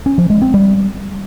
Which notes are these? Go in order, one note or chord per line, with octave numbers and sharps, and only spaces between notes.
C#4
F3
G#3
C4
G3